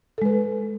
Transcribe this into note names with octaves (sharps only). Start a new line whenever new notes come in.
G#3 A4 B4